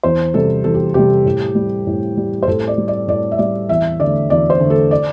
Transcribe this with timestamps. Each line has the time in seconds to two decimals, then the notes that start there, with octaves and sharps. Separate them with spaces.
0.04 E2 C5
0.34 C3 G3 A4
0.64 E2 A4
0.74 G4
0.94 C3 G3 G4
1.25 A2
1.55 G3
1.87 A2
2.17 G3
2.43 C5
2.47 A2 A4
2.68 D5
2.78 G3
2.88 D5
3.08 A2 D5
3.32 E5
3.38 G3 D5
3.69 E2 E5
4.00 D3 A3 D5
4.30 E2 D5
4.50 C5
4.60 D3 A3
4.70 A4
4.91 D5